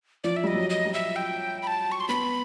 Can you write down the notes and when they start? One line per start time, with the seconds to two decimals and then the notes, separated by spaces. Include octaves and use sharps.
0.24 F3 D5
0.36 E5
0.44 G3 D#5
0.54 F#3
0.70 D#5
0.85 G3
0.94 E5
1.16 G5
1.62 B5
1.67 A5
1.92 C#6
2.00 C6
2.09 B3 B5